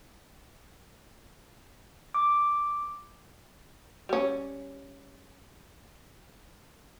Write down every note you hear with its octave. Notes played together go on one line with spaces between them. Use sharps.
D6
G3 C#4